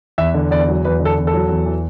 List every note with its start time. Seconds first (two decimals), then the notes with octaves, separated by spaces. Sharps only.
0.18 E2 E5
0.34 D3
0.51 E2 D5
0.68 F#3
0.85 E2 B4
1.00 D3
1.05 A4
1.17 E2
1.27 A4
1.34 F#3
1.49 E2
1.65 E3